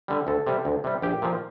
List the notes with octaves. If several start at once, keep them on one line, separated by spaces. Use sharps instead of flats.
D3 G3
D2 A4
C3 G3
D2
C3 G3
A#1 G4
A#2 F3